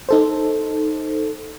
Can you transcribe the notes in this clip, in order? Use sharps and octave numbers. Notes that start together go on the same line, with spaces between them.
D#4 A4 C5